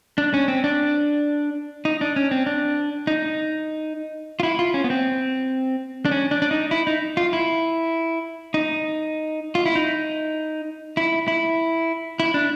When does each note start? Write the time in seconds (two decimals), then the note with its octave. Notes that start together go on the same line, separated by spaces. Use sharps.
0.18 D4
0.34 C#4
0.48 C4
0.64 D4
1.85 D#4
2.01 D4
2.16 C#4
2.31 C4
2.46 D4
3.07 D#4
4.40 F4
4.43 E4
4.59 F4
4.74 C#4
4.84 B3
4.90 C4
6.05 D4
6.11 C#4
6.31 D4
6.42 D4
6.51 D#4
6.71 E4
6.87 D#4
7.17 F4
7.33 E4
8.54 D#4
9.55 F4
9.66 E4
9.75 D#4
10.97 E4
11.28 E4
12.20 E4
12.34 D4